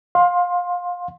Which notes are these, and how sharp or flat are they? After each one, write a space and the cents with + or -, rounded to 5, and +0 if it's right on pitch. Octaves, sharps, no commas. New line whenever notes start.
F5 +25 C6 +15